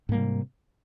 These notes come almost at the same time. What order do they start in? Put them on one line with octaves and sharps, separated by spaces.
G#2 A#3 G3 C3